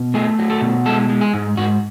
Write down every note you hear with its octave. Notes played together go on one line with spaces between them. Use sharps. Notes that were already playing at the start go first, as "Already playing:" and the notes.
Already playing: B2
A3 G#4
F#3
A4
B2
G#3 A4
G#3
G#4
G#2
G#2 F#4